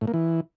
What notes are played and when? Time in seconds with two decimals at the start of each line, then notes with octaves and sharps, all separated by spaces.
0.01 A2
0.07 A#3
0.14 E3